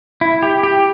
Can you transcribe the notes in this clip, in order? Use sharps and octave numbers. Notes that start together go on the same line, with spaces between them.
E4
G4
G4